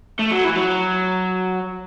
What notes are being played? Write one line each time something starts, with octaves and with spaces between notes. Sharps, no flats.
A3
F#3
E3
F#3